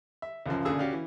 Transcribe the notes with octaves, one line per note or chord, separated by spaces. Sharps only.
E5
C#2 F#2 C#3 F3
D2 A#2 C#3 D4 G#4 E6
C#4 F#4 G4 D5 F5
E3